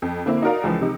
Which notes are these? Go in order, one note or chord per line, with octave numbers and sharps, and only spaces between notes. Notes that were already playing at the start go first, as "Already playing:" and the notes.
F2
D3 A#3 C4 E4
D#4 F#4 A#4 D5 F5
C#2 E3 F3
C3 D#4